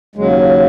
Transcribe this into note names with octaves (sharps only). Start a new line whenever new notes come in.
D#2 C#3 F#3 G#3